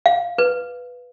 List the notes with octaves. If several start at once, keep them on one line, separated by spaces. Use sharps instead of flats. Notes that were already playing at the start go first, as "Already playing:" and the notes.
F5
B4